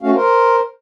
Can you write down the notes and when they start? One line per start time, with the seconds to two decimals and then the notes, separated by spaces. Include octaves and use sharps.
0.02 A3 C#4 F#4 F5
0.15 A#4 C5